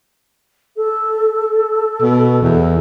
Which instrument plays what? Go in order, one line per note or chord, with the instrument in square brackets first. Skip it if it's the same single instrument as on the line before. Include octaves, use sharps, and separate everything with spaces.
[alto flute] A4
[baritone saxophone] B2
E2